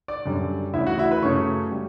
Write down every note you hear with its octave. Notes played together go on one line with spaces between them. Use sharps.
D5 D6
F#2 D3 G3
D2 C#3 E3 E4 E5
F#4 F#5
E4 E5
B4 B5
F#2 C#3 F#3 A3 C#5 C#6
G3